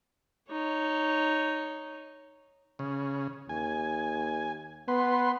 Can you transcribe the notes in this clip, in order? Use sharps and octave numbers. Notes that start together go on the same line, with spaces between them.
D#4 C#5
C#3
D#2 G#5
B3 B4 C6